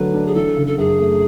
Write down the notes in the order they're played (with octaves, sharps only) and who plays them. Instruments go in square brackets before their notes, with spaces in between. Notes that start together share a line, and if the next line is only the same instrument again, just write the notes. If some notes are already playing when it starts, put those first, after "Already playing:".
Already playing: [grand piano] D3 F#3 A3 [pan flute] B4
[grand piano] D4
[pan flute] G#4
[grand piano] E3 [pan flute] A4
[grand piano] C#3
[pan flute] A4
[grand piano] F#2 [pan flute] G#4
[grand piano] A3